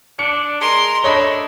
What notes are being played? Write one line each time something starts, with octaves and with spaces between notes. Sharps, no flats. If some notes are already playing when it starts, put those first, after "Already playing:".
D4 C#7
G#3 A#4 C6
A3 D4 C#5 D#5 B5